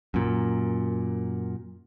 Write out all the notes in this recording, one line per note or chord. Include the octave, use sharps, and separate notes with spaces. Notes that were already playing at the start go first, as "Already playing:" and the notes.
F#2 A#2